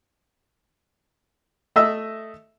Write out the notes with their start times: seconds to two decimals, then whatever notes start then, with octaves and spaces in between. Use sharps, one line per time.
1.76 A3 D#5 E5 E6